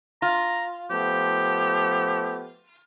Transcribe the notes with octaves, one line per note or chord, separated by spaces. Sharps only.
F4 A#5
F3 A3 B3 G4